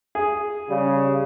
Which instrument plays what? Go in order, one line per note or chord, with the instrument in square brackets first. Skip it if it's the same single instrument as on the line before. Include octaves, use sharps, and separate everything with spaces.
[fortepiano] G#4
[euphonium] C#3 [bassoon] G3